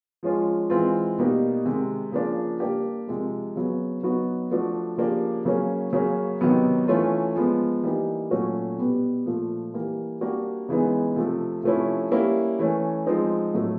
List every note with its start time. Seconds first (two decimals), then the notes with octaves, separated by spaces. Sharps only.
0.23 F3 G#3 C#4 F4
0.70 E3 G#3 C4 F4
1.18 B2 G3 A#3 D#4
1.65 C3 D#3 G#3
2.12 C#3 F3 A#3 D4 F4
2.60 G3 A#3 D4 G4
3.08 C3 F3 G#3
3.56 C#3 F#3 B3
4.03 F#3 B3 D#4 F#4
4.51 F3 A3 D4 F#4
4.97 C#3 F3 A#3 D4 G4
5.45 C#3 F#3 A#3 C#4
5.93 C#3 F#3 A#3 C#4
6.41 C3 D#3 F#3 B3
6.88 E3 A3 C#4 F4
7.36 F3 G#3 B3
7.83 E3 G3 A#3 D#4
8.31 A#2 F#3 A3 C#4 F#4
8.78 B2 G3 B3
9.26 A#2 F3 A3
9.74 E3 G3 A#3
10.21 G3 A#3 D4 F#4
10.69 C#3 E3 G#3 B3 D#4
11.16 C3 F3 A3
11.63 C3 F3 A3 C#4 E4
12.11 G3 A#3 C#4 E4
12.59 E3 A3 C#4
13.07 F3 G#3 C4 D#4
13.54 A2 F#3 A3